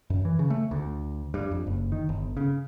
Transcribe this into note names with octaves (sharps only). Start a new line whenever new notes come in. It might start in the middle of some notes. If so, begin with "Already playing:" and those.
F#2
E3
C#3
A3
D2
G2
F2
F#1
D#3
G1
C#3